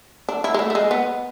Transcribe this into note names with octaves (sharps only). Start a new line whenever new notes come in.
D4
E4
G#3
A3
A3
G#3
B3